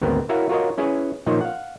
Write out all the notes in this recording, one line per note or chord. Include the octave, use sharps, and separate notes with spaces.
G#1 D2 B3 C4 A#4
E4 F#4 A#4 C#5 E5 F5
F4 F#4 A#4 C#5 D#5
C#4 E4 G#4 B4 C#5
A#2 D#3 F3 D#4 C5 C#5
F5 F#5